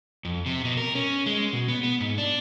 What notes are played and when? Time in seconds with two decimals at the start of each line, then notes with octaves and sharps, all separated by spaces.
0.25 F2
0.46 C3
0.65 B2
0.77 A#4
0.95 C#4
1.26 G#3
1.53 B2
1.68 B3
1.83 B3
2.00 G#2
2.18 D4